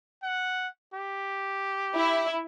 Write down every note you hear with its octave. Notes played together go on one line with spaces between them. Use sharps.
F#5
G4
E4